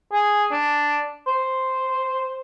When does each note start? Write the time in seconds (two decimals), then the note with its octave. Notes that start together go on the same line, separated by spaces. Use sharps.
0.12 G#4
0.52 D4
1.27 C5